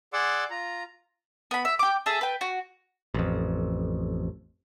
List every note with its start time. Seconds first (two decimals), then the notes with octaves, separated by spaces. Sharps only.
0.13 G#4 D5 F#5 C6 D6 E6
0.50 F4 A#5
1.51 B3 B5
1.65 E5
1.79 G5 D6
2.06 G#4 A4 E5
2.21 B4 G5
2.41 F#4
3.14 A1 F2